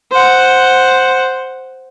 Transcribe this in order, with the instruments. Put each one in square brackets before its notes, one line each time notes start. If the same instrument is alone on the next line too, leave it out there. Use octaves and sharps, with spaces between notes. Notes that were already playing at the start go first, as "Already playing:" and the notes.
[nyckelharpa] C5 F#5